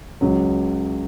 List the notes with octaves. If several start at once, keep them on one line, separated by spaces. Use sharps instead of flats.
C#2 C#3 F#3